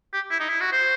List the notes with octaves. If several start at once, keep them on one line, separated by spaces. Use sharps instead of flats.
G4
E4
D#4
E4
F#4
C5